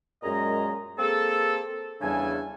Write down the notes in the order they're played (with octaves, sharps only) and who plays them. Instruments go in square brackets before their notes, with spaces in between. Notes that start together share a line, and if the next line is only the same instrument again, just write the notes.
[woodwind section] F#2 A#2 G#3 G#4 D#5 A#5
A#3 C4 G#4 A4
E2 C#3 G3 D4 A4 G#5